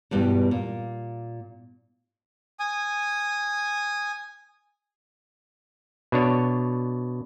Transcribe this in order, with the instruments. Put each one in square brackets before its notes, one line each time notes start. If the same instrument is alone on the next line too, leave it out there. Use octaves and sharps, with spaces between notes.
[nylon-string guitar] E2 G2 B2 G3 B3 G4
A#2
[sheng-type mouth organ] G#5 D#6
[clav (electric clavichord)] B2 D4 C#5